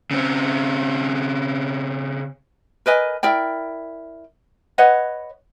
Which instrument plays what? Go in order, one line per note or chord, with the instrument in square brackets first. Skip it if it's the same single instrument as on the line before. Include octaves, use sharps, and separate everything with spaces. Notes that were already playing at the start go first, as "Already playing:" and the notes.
[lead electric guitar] C#3 C4
[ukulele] A#4 B4 D#5 G#5
E4 A#4 D5 G5
B4 C#5 D#5 F#5